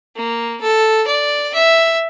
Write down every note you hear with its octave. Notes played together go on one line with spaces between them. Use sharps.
A#3
A4
D5
E5